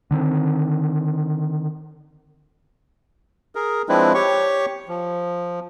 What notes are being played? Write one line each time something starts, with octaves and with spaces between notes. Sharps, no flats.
D3 D#3 C4
G#4 A#4
F3 G#3 C4 D4 E4 B4
G4 C#5 C#6
F3